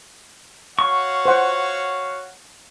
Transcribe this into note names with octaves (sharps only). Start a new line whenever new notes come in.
F#4 C#5 F5 C#6
C5 F#5